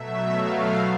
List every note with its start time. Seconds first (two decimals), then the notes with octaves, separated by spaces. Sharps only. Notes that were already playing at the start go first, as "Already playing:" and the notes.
Already playing: B2 F#3 A3 E5
0.32 F5